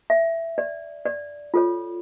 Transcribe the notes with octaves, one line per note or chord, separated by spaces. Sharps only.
E5
D5
D5
F4 A4 C#5